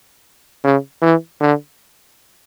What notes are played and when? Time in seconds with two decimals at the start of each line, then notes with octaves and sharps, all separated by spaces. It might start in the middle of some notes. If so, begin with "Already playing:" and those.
0.64 C#3
1.02 E3
1.41 D3